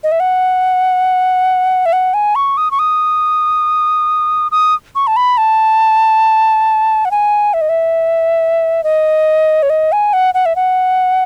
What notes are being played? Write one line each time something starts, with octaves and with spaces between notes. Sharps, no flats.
D#5
E5
F#5
E5
F#5
G#5
C#6
D#6
C#6
D#6
D#6
C#6
A5
B5
A5
F#5
G#5
E5
D#5
E5
D#5
C#5
D#5
G#5
F#5
F#5
E5
F#5